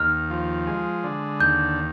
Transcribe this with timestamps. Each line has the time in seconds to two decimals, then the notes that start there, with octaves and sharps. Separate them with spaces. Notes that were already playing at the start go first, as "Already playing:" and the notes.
Already playing: D#2 F6
0.30 F3
0.67 G#3
1.03 D3
1.40 D#2 G6